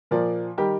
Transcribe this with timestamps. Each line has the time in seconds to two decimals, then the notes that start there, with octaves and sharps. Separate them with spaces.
0.11 A#2 F3 A#4 D5
0.57 D#3 G3 G4 A#4